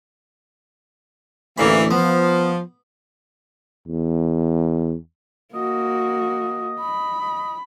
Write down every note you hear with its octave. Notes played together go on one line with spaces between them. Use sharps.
A1 D2 E3 A#3 B5
F3 B3
E2
A#3 F#4 D#5
B5
D#5